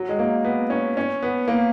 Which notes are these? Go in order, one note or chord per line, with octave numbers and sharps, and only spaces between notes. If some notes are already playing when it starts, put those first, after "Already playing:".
Already playing: F#3
G#3
A#3
B3
C#4
C#4
B3
A#3